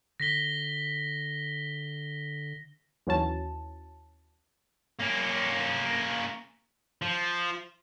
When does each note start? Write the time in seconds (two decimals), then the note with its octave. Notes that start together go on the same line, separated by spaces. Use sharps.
0.20 D3 A#6 B6 G7
3.07 D#2 E3 F#3 C#4 A5
5.00 A#3 C#4
7.02 F3